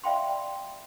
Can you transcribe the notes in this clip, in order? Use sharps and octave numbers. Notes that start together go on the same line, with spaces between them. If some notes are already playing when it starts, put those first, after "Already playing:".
D5 E5 F5 G5 B5 C6